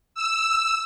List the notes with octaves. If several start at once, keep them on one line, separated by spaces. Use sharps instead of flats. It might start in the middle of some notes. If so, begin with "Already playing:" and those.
E6